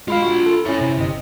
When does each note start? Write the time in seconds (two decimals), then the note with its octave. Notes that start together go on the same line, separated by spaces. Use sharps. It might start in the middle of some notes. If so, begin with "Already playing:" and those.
0.08 G#3 F4 F5 B5
0.22 F#4
0.46 A4
0.66 C#4 E4 C#5 E5
0.81 C3
0.98 G1 D#5